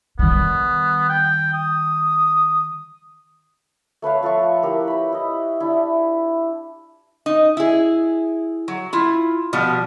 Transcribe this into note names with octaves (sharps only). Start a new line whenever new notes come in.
D#3 G3 B3
G5
D#6
A3 B4 C#5 F5
F3 A4 F5 C#6
E4 G4 A#4
B4 B5
E4 D#5
D4 E4
D#4
E4 G#4
F#3
E4 F4
B2 F3 G3